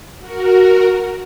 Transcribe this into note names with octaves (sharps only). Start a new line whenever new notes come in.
F#4 A#4